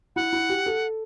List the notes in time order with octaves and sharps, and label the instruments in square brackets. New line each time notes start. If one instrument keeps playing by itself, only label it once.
[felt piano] E4 [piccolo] F#5
[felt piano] E4
G4
A4